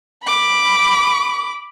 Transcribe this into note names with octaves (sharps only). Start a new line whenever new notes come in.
B5 D6